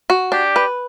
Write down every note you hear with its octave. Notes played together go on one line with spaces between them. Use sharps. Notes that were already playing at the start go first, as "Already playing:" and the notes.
F#4
D4 G4
B4